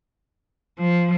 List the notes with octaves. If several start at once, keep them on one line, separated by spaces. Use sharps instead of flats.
F3